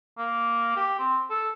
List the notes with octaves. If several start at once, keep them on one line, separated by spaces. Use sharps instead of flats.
A#3
G4
C4
A4